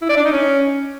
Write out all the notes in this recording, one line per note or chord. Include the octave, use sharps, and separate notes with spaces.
E4
D5
D4
D#4
C#4